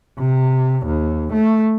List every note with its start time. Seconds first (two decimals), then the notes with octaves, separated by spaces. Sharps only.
0.19 C3
0.86 D#2
1.33 A3